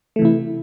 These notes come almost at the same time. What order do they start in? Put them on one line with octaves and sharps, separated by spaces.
A3 E3 C3 E4